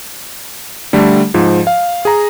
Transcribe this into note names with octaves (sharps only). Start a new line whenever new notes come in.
D3 G3 A3
G#2 F3
F5
G#4 A#5